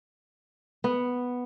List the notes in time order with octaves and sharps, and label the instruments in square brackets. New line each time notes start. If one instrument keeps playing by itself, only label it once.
[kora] B3